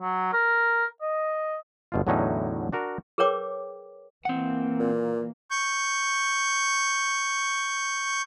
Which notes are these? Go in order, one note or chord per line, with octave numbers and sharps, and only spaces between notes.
F#3
A#4
D#5
G1 B2 F4
E2 A2 D3 F#3 C#4 D#4
D4 F#4 A#4
G#4 A#4 B4 C#5 G5 D6
E3 A#3 C4 F#5
A#2
C#6 G6